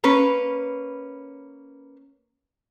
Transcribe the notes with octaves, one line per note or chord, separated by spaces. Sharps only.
A#3 C#4 B4